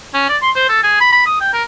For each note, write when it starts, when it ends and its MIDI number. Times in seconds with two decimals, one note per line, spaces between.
0.14 0.28 61
0.29 0.37 74
0.42 0.51 84
0.55 0.65 72
0.69 0.81 69
0.83 0.98 68
1.01 1.10 83
1.12 1.26 83
1.26 1.36 87
1.41 1.50 79
1.53 1.63 70